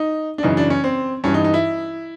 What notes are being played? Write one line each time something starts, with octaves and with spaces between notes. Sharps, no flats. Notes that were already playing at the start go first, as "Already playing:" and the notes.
Already playing: D#4
D4
F#2 C#3 E3 D#4
D4
C#4
C4
G2 E3 C#4
D#4
D#4
E4